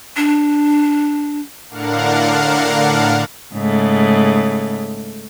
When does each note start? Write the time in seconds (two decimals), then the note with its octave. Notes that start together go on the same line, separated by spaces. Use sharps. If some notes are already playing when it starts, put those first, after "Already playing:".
0.17 D4
1.70 A2 D3 D4 A#4 F5 F#5
3.54 G#2 C#3 A3